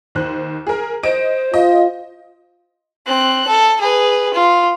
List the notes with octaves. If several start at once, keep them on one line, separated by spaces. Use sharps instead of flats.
D#2 C5 F#6
G#4 A#4
C5 D#5 D7
F4 D#5
C4 F#6
A4
G#4 B4
F4